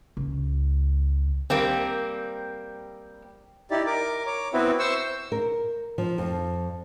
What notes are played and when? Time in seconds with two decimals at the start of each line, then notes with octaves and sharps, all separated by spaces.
0.17 C#2
1.50 G3 A#3 C4
3.71 D#4 E4 G4 D5
3.86 A#4 D6
4.26 C#5 D6
4.53 B3 C4 E4 F#4 B4
4.79 C5 C#6 E6
5.32 A#4
5.98 F3
6.18 F2